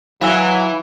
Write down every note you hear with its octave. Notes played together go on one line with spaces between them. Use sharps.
E3 F#3 F5 G#5 E6